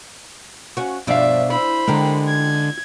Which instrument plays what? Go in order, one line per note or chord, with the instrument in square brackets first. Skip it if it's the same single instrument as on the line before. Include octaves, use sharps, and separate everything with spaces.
[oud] C#4 F#4
[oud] G2 F3 D5 [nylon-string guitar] B2 D4 F5 [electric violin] E5
[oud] E4 [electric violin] C5 B5
[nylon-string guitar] D3 G#3 [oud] G4 A#4
[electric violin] G#6